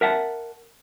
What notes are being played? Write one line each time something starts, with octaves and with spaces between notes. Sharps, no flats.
A#4 E5 F#5 A5